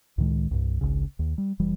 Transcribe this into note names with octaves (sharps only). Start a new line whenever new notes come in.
C#2 A2 D#3 G#3
C2 G2
G#1 C#2 C#3
D#2
G3
F1 E3 G3